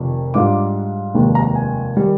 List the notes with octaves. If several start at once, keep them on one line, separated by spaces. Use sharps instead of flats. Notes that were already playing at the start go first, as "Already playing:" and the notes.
Already playing: F1 F2 D#3
G#2 G3 D4 F4 D6
F1 D#2 D#3 G#3
A#5
G#5
D#3 G3